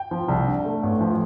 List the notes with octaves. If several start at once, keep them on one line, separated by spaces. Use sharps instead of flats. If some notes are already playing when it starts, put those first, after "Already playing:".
Already playing: G5
F3
C2
D4
A3
A1
F3